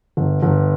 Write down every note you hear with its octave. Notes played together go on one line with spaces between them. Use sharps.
G1
G1